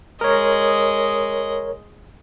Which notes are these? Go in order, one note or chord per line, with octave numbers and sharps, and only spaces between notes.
G#3 A#4 C#5 D#5